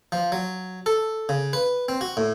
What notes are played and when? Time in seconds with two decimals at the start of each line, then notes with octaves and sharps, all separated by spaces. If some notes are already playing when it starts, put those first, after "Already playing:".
0.12 F3
0.32 F#3
0.86 A4
1.29 C#3
1.53 B4
1.89 C4
2.01 F#4
2.17 A2